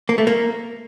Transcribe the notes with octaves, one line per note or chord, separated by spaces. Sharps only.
A#3
A3
A#3